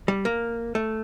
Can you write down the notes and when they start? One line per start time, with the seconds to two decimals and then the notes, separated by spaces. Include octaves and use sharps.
0.08 G3
0.25 A#3
0.75 A3